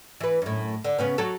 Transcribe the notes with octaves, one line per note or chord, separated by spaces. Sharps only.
E3 B4
F#2 A2
D3
C#3 B3 C#4
F#3 A4